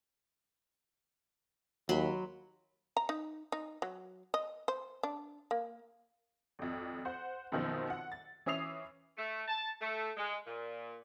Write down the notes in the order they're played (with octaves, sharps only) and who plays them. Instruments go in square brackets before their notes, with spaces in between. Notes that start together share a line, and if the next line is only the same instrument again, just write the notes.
[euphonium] D#2 [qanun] F#3 B5 C6
[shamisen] A#5
D#4
D#4
F#3
D#5
C5
D4
A#3
[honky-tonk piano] G#1 F2
C5 F#5
F#2 B2 D#3 F3 C4 D#4
F#5
A6
E3 C#4 E5 D#6 C7 F7
[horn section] A3
A5
A3
G#3
A#2